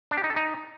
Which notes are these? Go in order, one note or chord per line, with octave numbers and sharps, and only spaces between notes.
D4
G4
D#4
A4
D#4